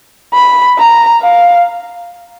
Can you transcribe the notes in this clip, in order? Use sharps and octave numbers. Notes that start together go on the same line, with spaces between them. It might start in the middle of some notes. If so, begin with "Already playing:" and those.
B5
A#5
F5